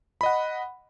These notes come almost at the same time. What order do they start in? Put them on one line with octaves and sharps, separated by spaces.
B5 D#5 F#5